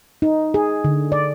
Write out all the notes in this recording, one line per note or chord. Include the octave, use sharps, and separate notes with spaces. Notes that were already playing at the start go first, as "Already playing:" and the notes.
D#4
G#4
D3
D5